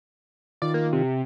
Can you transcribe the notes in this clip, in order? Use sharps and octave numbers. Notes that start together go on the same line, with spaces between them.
D#3 F4 D5
A#3
C3